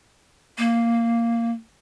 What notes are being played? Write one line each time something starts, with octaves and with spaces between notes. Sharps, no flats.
A#3